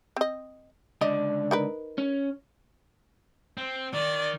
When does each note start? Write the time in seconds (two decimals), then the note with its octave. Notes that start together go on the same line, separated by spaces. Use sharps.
0.16 C4 D#5
1.01 C#2 D3 D5 D#5
1.51 D#4 A#4 B4
1.98 C#4
3.58 C4
3.94 D#3 D5